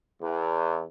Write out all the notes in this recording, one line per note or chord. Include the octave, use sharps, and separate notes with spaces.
E2